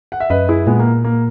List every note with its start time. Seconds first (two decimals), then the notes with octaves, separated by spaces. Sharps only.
0.12 F#5
0.20 E5
0.30 F#2 B4 D#5
0.49 E4 G#4
0.67 A#2 G#3 B3
0.79 A#3
1.04 A#3